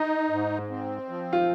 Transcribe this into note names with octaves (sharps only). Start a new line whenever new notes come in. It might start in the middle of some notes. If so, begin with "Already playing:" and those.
Already playing: D#4 D#5
G#2
C4
F3
F4